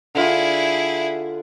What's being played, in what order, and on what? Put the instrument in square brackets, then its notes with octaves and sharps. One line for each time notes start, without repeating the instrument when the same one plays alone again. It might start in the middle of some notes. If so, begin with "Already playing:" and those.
[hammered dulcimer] D3 F4 [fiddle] E4 G#4